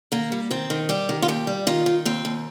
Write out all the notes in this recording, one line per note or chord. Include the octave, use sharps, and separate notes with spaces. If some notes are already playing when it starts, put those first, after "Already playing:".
D#3 A#3
G3
D#3 C4
D#3
G3 G4
D#3
F4
D#2 G4
G3
D#3 F4
D#3
D#2 C4
D#2